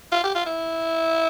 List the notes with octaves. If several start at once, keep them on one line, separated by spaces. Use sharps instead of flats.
F4
G4
F4
E4